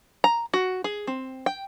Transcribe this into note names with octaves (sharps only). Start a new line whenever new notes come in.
A#5
F#4
G#4
C4
G5